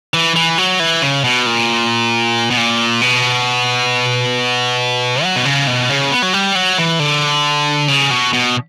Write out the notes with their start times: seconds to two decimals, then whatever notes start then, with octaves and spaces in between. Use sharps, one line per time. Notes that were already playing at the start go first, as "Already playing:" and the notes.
0.14 E3
0.36 E3
0.58 F#3
0.80 E3
1.02 C#3
1.24 B2
1.46 A#2
2.50 B2
2.57 A#2
3.01 B2
5.23 F#3
5.36 B2
5.45 C#3
5.67 B2
5.89 C#3
6.11 B3
6.22 F#3
6.33 G3
6.55 F#3
6.78 E3
6.99 D3
7.88 C#3
8.10 B2
8.33 B2